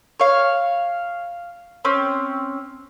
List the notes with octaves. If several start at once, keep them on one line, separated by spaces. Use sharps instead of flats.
C#5 F5
C4 C#4